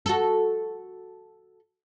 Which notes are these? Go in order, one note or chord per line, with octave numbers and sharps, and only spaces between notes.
F#4 A4